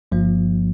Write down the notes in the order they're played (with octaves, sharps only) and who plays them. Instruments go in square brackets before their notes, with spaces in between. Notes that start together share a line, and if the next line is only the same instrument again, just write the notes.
[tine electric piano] G1 G2 F3 A#3